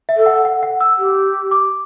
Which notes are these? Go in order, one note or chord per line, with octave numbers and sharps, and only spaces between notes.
E5
A4
F#5
F#5
F#5
E6
G4
D6